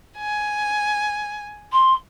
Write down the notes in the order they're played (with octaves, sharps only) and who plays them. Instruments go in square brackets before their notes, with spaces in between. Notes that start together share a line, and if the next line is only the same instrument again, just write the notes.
[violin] G#5
[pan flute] C6